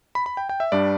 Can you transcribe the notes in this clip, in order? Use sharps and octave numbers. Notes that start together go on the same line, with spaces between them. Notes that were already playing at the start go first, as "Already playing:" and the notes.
B5
B5
G5
G5
E5
G2 G3 D4 D5